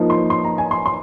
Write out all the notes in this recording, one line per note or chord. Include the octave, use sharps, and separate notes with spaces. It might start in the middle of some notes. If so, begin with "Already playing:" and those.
Already playing: F3 A#3 D#4
C6
C6
A#5
G#5
C6
C6